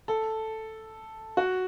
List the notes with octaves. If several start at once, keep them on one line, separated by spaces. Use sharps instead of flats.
A4
F#4